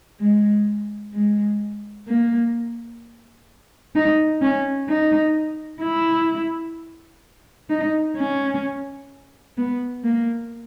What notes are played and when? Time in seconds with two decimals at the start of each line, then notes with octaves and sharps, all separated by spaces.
0.20 G#3
1.14 G#3
2.08 A#3
3.95 D#4
4.42 C#4
4.89 D#4
5.82 E4
7.70 D#4
8.17 C#4
9.58 B3
10.04 A#3